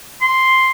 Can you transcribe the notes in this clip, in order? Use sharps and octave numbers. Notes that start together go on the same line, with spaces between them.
C6